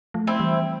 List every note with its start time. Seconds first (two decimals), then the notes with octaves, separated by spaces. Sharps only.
0.14 F3 A3
0.27 C4 E4
0.40 E3 G3